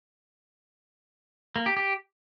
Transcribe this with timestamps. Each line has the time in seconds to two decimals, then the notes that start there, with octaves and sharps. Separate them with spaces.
1.56 A#3
1.66 G4
1.77 G4